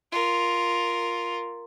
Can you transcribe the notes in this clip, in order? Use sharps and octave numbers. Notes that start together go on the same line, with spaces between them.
F4 A#4